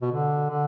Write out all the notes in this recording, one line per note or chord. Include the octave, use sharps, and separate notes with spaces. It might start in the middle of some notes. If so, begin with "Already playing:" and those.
B2
D3
D3